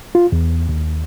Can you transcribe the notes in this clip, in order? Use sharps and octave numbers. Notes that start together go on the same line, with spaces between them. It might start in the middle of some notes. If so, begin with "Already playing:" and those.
F4
E2
D#2